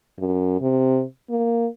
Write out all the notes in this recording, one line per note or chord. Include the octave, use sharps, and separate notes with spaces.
F#2
C3
A#3